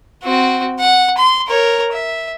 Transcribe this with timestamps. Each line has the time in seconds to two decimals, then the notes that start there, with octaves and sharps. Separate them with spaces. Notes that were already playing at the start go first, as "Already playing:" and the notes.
0.23 C4 F#4
0.80 F#5
1.18 C6
1.48 A#4 C#5
1.92 E5